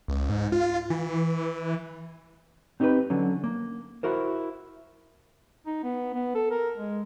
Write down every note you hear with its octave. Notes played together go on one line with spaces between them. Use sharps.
C#2
G#2
F4
E3
E3
C4 D#4 G4 A4 B4
D3 F#3 C#4
A#3
E4 F#4 A#4 C5
D#4
B3
B3
A4
A#4
G#3